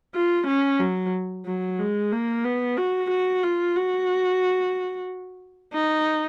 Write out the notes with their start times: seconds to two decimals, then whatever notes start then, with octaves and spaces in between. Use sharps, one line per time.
0.15 F4
0.47 C#4
0.80 F#3
1.46 F#3
1.79 G#3
2.12 A#3
2.44 B3
2.77 F#4
3.10 F#4
3.43 F4
3.76 F#4
5.74 D#4